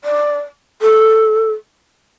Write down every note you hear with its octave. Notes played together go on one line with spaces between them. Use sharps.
D5
A4